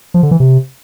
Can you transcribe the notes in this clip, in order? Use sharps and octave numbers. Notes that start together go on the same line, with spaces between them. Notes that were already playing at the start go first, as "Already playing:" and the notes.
F3
D3
E3
C3